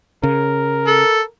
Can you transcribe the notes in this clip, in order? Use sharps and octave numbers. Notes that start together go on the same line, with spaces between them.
C#3 A#4
A4